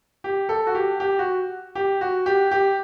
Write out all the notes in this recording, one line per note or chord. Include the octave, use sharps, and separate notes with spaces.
G4
A4
F#4
G4
G4
F#4
G4
F#4
G4
G4